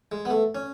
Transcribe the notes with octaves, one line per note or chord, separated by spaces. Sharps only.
G#3
B3
A3
C#4